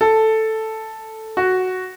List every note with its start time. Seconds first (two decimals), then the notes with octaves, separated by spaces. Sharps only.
0.01 A4
1.37 F#4